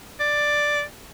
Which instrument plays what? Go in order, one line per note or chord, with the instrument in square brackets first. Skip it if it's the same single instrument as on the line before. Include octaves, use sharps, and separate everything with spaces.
[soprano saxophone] D5